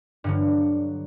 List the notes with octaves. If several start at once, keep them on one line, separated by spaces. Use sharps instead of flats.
G2 D3 F#3